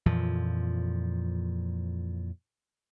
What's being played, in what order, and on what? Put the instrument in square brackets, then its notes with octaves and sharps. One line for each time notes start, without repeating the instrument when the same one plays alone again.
[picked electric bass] F2 A#2 E3 F3